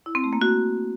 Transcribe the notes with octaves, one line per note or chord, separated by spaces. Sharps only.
E4
C4
A3
A#3
F#4